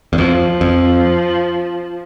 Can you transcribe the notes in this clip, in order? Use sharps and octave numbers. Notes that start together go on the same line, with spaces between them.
E2
F2 F3
F2